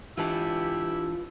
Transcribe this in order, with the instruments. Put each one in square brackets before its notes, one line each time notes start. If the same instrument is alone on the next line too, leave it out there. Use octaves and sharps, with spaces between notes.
[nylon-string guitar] E3 D4 A5 [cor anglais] E4 [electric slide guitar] F4 B4 [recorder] G4